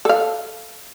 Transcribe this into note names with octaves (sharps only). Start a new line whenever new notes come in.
A4 F5